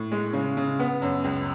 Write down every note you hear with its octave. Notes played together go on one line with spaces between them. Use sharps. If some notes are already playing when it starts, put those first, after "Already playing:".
Already playing: A2
G#3
C#3
C#3
B3
F#2
C#2